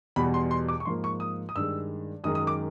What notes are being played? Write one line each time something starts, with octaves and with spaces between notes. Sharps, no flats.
E2 B2 G3 B5
C6
C6
D6
C#6
G#2 F3 A#3 C6
C#6
D#6
D#6
G2 D#3 G#3 E6
F#2 D#3 G#3 D#6
D#6
D6